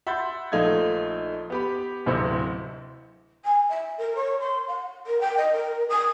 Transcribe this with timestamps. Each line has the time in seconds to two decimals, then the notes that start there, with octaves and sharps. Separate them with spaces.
0.07 E5 F#5 B5 C6 G6 A6
0.52 A#1 A3 D#4 F4 G#6
1.50 B3 G4 B5
2.06 D1 D2 C3 E4 C5 C#7
3.44 G#5
3.69 E5
3.98 A#4
4.15 C#5
4.40 C6
4.67 F#5
5.06 A#4
5.20 G5
5.37 D#5
5.53 A#4
5.89 D#6